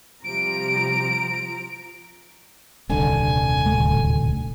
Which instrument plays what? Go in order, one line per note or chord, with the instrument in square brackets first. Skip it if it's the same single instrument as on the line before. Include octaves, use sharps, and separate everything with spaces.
[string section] C3 G3 [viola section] F3 A#5 [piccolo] D7
[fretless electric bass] D#1 C2 D3 [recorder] G#5
[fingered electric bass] D1 A3